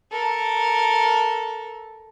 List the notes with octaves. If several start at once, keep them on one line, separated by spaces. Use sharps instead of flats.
A4 A#4